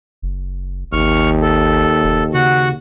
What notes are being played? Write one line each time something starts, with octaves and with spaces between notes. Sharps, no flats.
F#1
G#1 D#2 C#6 F6
A4
F1
C#3 F#4 F#5